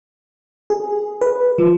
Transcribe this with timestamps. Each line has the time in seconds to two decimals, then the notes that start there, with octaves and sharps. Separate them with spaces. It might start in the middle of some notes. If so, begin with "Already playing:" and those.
0.70 G#4
1.21 B4
1.58 F3